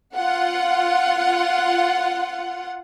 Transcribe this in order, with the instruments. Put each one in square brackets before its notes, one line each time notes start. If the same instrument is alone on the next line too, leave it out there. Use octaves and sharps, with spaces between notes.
[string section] F4 F#5